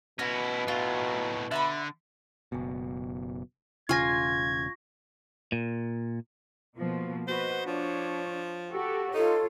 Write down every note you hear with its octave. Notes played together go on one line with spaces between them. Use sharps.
B2 C#4 E4 F#4
A2 F#3 F4
D3 E5 A5 B5
F#1 B2
E1 C#3 F4 G#5 C#6 G#6 A#6
A#2
B2 F3 A#3
F#4 B4 C5 D#5
F3 D4 C#5
F#4 G4 A4
D#4 F4 A4 C#5